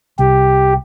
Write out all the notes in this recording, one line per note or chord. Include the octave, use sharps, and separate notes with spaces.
C2 G4